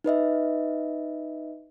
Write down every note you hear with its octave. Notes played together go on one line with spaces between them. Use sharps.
D#4 B4 D#5 E5